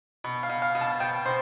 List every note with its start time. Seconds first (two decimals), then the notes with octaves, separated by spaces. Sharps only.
0.24 B2
0.43 F5
0.49 B2
0.62 F5
0.75 B2
0.81 A5
1.00 B2 G5
1.26 B2 C5